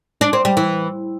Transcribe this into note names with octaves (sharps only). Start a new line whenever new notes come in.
D4
C4
G3
E3